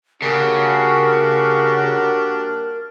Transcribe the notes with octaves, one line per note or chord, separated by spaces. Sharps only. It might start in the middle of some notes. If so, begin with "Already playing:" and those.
C#3 A#3 D4 F#4 G4 A#4